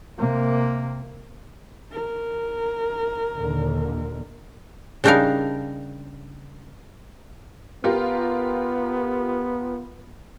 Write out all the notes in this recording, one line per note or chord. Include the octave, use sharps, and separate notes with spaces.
C3 A#3
A#4
D#2 A#2 D3
C#3 G3 D4 D#4 A#4 F5
B3 F4 G4 A#4